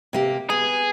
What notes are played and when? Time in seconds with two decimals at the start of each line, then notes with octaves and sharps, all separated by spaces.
0.13 C3 A#3 G4
0.50 B3 G#4